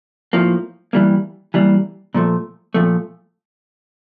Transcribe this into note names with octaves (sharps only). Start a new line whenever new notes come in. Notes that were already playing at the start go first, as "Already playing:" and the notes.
A2 F3 A#3
E3 G3 A#3
E3 G3 A#3
A#2 F3 A3
A#2 F3 A3